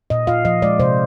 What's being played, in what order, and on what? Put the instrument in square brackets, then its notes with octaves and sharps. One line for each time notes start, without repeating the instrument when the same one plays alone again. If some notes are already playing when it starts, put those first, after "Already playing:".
[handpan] A#2 D#5
F4 F5
F3 D#5
G#3 D5
C3 C5